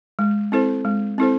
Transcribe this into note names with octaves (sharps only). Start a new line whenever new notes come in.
G#3
C4 E4 A4 C5
G#3
C4 E4 A4 C5